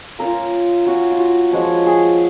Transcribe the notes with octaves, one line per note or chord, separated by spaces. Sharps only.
A#3 C#4 F4 A#4
A#3 C#4 F4 F#4
F4
F#4
F3 G#3 C#4 F#4
G#4